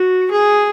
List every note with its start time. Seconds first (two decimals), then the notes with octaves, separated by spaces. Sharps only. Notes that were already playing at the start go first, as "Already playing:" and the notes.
Already playing: F#4
0.32 G#4